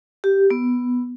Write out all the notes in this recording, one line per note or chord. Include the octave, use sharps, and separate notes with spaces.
G4
B3